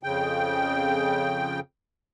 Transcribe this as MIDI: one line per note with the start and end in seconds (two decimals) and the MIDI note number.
0.03 1.60 41
0.03 1.60 49
0.03 1.60 79